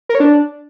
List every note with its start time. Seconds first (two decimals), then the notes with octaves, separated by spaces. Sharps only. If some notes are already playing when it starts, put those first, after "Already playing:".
0.09 A#4
0.15 C#5
0.20 D4